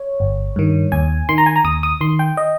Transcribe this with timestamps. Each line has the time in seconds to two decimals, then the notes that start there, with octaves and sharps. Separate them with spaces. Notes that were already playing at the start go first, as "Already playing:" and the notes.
Already playing: C#5
0.20 G1
0.56 G2 D#3
0.92 D#2 G#5
1.29 D#3 C6
1.38 A#5
1.46 G#5
1.56 A#5
1.64 D#2 D#6
1.83 D#6
2.01 D#3 C6
2.19 G5
2.37 D#5